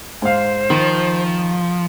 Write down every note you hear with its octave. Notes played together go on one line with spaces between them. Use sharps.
G#2 C5 F5
D#3 F3